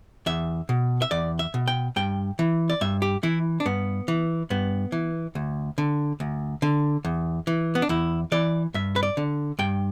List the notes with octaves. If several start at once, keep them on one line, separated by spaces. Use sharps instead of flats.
E2 E5
B2
E5
E2 D5
E5
B2
G5
G2 G5
E3
D5
G2 E5
G4
E3 E4
D4
G2 B3
E3
G2 B3
E3
D2
D3
D2
D3
E2
E3
B3
D4
E2 E4
E3 D5
G2 E5
B4
D5
D3
G2 G5